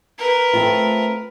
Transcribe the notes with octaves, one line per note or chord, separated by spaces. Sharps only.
A#4 B4
A3 C4 F4